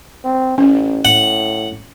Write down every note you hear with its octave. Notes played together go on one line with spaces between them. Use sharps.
C4
A1 C#4
A2 F#5